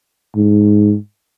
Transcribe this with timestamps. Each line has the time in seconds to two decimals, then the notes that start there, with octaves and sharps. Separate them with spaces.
0.36 G#2